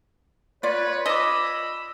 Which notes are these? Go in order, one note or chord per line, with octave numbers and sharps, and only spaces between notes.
F4 B4 C#5 D5
D#5 B5 D6 E6